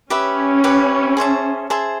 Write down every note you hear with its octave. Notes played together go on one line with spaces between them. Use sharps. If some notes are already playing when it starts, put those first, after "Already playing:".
C#4 G4 B4 E5
G4 B4 E5
G#4 C5 E5 A5
G#4 C5 E5 A5